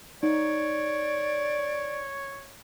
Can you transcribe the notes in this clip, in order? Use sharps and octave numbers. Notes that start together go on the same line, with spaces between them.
D#4 C#5 D5